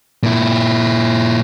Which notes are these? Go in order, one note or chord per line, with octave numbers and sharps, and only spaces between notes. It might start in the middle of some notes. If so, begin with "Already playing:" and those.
A#2 E4